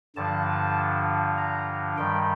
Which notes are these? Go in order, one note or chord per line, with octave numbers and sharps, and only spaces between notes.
G2 D3 F3 A5
A#5
G2 D#3 G3 G5